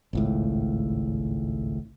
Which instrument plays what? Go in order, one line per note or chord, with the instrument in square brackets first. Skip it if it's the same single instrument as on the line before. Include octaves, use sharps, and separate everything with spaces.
[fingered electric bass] G#1 C#2 A2